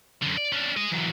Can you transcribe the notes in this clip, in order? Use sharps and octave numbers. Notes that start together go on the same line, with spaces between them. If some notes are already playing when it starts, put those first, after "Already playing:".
F#2 D3
D5
C#4 D4
G#4 D#5
E3 F#3